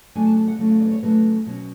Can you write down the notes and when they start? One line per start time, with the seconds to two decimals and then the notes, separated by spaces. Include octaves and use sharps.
0.15 C#3 F#3 A3 D4 G#5
0.27 A5
0.38 A5
0.48 F#5
0.58 C#3 F#3 A3 D4
0.70 F5
0.81 D5
0.86 B4
0.91 C#5
1.02 C#3 F#3 A3 D4 B4
1.46 B2 F#3 C#4